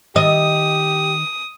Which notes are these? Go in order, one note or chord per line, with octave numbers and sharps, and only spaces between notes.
D#3 G4 D#5 E5 D#6